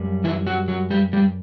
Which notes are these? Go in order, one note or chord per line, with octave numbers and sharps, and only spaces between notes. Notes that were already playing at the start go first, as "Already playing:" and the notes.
Already playing: F#2 G3
E3 E4
F#3 F#4
F#3 F#4
G3 G4
G3 G4